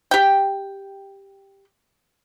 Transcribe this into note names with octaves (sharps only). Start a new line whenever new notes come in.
G4 G5